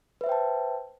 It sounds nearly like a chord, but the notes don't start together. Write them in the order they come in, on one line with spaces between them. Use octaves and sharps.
B4 E5 C5 G5 A5